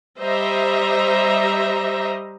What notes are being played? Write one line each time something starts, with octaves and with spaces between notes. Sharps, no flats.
G3 C5 D#5 E5 A#5